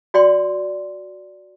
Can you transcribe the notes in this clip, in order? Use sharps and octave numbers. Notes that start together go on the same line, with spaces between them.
F#4 D5 G5 C6